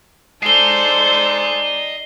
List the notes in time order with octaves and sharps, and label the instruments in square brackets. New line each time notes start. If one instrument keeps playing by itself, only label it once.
[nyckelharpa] D#4 D5 [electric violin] A4 C5 [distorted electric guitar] D#5 G#5 [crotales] C7 G7